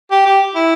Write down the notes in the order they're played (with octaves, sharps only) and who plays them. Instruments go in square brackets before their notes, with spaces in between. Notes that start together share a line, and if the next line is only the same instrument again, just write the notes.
[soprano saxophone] G4
G4
E4